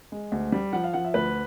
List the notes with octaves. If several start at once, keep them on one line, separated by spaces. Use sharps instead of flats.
G#3
D2
G3
F3 F#5
F5
F3 F#5
E5
D2 B4